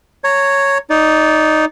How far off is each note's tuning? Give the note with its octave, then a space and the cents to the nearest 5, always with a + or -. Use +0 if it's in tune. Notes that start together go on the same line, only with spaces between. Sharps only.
C#5 +0 A#5 -25
D#4 +0 D5 -20